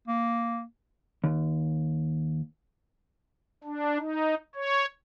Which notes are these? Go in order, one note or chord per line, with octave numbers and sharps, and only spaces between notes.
A#3
D#2
D4
D#4
C#5